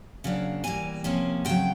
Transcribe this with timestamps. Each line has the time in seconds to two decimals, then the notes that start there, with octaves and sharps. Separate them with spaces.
0.24 C#3 F#3 A#3 D4
0.64 E2 C#3 E3 G3 A#3 G#5
1.04 C3 F3 A#3 C#4
1.45 F2 C#3 F#3 G5